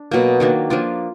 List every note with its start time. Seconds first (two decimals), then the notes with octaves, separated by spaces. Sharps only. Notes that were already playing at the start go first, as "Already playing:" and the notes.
Already playing: D4
0.11 B2 F#3 A#3
0.40 D#3 F#3 A#3 D4
0.70 F3 A#3 D4 F4